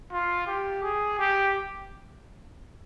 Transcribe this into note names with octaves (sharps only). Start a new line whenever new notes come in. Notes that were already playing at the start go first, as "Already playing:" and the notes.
F4
G4
G#4
G4